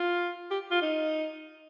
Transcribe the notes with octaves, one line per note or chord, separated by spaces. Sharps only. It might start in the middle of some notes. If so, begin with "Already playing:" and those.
Already playing: F4
G4
F4
D#4